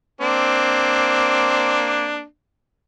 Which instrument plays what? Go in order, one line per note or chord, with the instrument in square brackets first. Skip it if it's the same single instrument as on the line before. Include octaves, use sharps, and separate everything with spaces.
[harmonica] A#3 C4 D4